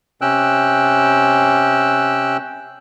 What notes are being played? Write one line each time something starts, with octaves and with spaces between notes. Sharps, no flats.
C3 C#4 G5 E6 F#6